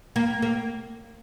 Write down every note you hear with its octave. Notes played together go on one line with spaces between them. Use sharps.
A#3
A#3